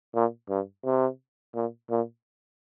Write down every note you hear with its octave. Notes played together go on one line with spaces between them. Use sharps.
A#2
G2
C3
A#2
A#2